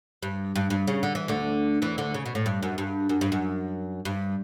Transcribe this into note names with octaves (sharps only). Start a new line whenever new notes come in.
G2
G2
G2
C#3
D3
E3
D2 D3
E2 E3
D2 D3
C#3
B2
A2
G2
F#2
G2
F#2
G2
F#2
G2